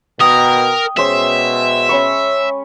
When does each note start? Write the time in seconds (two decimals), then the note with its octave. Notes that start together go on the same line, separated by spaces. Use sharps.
0.20 B2 A#4 D#5 G5 D#6
0.97 B2 G#3 C#4 C5 E5
1.89 C#4 B5 C#6